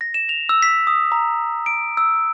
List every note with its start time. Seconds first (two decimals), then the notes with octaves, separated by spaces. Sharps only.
0.01 A#6
0.14 E7
0.29 F7
0.49 E6
0.62 B6
0.87 D#6
1.12 A#5
1.66 D7
1.97 E6